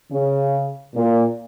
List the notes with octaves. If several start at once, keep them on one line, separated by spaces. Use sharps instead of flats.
C#3
A#2